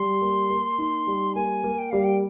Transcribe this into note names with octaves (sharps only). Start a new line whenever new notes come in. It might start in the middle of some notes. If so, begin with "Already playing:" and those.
Already playing: G3 C6
A#3
A#3
D#4
G3
A#3 G#5
A#3
G5
G3 F5
G5